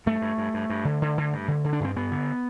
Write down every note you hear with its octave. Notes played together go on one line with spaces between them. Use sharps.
G2 A3
G2
G2
G2
G2
D3
D3
D3
G2
D3
D3
D4
G2 C4
G2 B3
D3